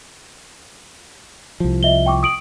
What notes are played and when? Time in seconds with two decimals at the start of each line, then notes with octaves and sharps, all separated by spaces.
1.60 C2 F3
1.83 D#5 E5 G7
2.06 G5 C#6 D6
2.23 D#6 D7 F#7